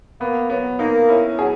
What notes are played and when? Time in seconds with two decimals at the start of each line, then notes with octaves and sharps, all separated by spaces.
0.21 A#3 B3
0.50 F#3 B3
0.79 A#3 D#4
1.09 C#4 E4
1.38 F#3 G#4